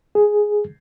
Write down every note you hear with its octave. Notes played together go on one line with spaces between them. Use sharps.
G#4